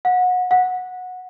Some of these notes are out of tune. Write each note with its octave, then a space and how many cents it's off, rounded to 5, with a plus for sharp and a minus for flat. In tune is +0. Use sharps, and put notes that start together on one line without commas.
F#5 -25
F#5 -15